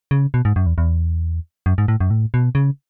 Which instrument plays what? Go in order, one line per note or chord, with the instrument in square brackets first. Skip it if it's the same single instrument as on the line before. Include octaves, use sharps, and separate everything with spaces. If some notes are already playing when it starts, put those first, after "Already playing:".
[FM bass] C#3
B2
G#2
F#2
E2
E2
F#2
G#2
A2
F#2
A2
B2
C#3